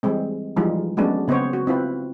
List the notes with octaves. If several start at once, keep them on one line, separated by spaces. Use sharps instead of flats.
E3 G3 G#3 C4
E3 F3 G3 G#3 D#4 F4
F#3 G#3 A3 B3 C#4 D4
C#3 B3 C4 C5 C#5
F#4
C4 E4 F4 B4